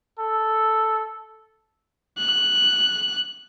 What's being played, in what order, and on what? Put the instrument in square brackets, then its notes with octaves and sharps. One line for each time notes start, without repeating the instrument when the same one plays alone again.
[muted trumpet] A4
[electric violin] F#6